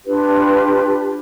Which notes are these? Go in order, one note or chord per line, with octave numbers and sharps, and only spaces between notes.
D4 F4 G4 B4